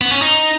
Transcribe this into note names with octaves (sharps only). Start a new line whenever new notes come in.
B3
C#4
D#4